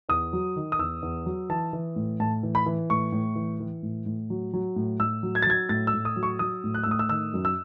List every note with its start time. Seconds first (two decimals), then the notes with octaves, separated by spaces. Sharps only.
0.09 E2 D#6
0.33 F#3
0.56 D#3
0.72 D#6
0.79 E2 E6
1.03 E2
1.26 F#3
1.50 E3 A5
1.73 E3
1.96 A2
2.20 A2 A5
2.43 E3
2.55 B5
2.66 E3
2.90 A2 C#6
3.12 A2
3.36 E3
3.60 E3
3.83 A2
4.06 A2
4.30 F#3
4.53 F#3
4.76 A2
5.00 A2 E6
5.23 F#3
5.35 G#6
5.43 A6
5.46 F#3 G#6
5.69 A2 A6
5.87 E6
5.94 A2
6.05 D#6
6.16 F#3
6.23 C#6
6.39 F#3 D#6
6.64 A2
6.74 F#6
6.84 A2 E6
6.91 D#6
6.99 E6
7.09 D#3 E6
7.34 F#2
7.45 E6